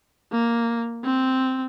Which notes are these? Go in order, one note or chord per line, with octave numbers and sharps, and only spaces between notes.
A#3
C4